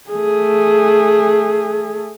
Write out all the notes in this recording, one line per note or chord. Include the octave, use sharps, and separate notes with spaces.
A3 G#4